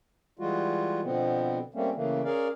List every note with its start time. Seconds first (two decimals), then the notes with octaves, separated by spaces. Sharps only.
0.39 E3 G3 G#3 F4 F#4
1.03 B2 D3 F3 B3 C4
1.74 G3 A3 A#3 C4 C#4
1.95 C#3 E3 A3 A#3
2.24 C#4 G#4 A#4 D5 F5